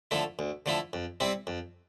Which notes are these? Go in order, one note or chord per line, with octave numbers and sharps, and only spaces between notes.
D3 F3 A3 E4
D2
D3 F3 A3 E4
F2
C3 G3 C4 E4
F2